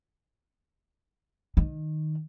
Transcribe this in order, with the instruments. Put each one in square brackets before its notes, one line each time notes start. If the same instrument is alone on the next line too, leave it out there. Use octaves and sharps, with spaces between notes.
[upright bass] D#3